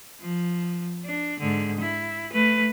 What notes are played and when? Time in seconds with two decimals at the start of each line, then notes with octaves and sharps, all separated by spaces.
0.21 F3
1.05 D4
1.40 G#2 D3
1.81 E4
2.33 A3 B4